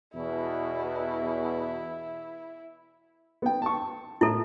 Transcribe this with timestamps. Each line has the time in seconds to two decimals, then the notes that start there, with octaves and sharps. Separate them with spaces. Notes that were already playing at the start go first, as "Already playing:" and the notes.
0.14 E2 B2 E4
3.42 B3 G5
3.62 A5 C#6
4.21 A2 E4 A4